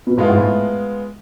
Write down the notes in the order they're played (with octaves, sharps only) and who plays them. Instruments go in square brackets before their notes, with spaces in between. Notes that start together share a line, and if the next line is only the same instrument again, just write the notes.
[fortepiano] B2
[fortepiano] A2 [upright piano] G#3 B3 F4
[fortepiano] G#2
A2